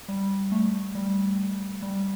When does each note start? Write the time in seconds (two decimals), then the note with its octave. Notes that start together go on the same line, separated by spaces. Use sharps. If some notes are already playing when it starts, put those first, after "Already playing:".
0.08 G3
0.52 A3
0.95 G3
1.82 G3